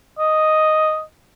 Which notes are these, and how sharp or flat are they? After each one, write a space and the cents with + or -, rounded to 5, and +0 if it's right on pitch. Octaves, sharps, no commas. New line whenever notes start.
D#5 +0